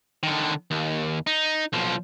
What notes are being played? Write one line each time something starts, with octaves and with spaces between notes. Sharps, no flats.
D3 D#3
D#2
D#4
B1 F3